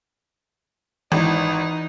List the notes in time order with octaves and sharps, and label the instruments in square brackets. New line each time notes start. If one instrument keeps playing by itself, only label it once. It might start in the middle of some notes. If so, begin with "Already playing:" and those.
[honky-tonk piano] G#1 [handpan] E3 [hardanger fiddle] D#4